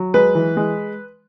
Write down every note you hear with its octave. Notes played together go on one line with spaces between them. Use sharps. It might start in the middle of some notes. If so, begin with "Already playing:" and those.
Already playing: F#3
G#3 B4
E3
G#3